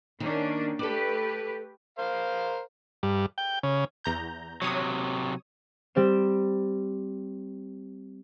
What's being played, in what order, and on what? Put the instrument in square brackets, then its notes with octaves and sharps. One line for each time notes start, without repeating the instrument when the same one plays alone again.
[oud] D#3 [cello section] A#3 C#4 D4
[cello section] A3 G4 B4 [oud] A4 D5
[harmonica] A#4 C5 F5
[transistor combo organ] G2
G5
C#3
[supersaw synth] E2 A#5 G6
[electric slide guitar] C3 F#3 [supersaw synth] C#5 D#6
[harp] G3 C4 E7